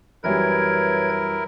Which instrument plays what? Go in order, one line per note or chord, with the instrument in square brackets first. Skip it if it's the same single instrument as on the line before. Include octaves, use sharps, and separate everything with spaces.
[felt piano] F#2 E3 G3 [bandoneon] E4 A#4 [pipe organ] B4 C#5 G#6